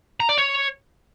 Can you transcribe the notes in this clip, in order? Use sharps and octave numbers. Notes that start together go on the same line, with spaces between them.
A#5
D5
C#5